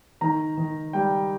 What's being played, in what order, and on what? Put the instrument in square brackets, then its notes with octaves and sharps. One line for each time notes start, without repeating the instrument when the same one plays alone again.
[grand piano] D#3 A#5
D#3
G3 G5